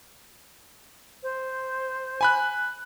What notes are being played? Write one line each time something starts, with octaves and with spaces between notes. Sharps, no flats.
C5
G#5 B5 F#6